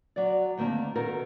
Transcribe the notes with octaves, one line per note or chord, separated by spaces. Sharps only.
F#3 D5
D2 D#3 A#3 C4 A5
B2 D#3 A4 A#4